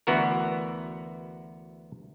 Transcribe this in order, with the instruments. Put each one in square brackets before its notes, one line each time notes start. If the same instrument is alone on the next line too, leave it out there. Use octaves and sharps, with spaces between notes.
[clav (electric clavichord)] D2 E3 B3 F#4 A#4